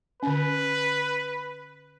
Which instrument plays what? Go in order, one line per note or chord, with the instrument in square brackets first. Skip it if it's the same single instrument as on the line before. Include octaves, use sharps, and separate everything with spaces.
[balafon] D3 C#4 [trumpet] B4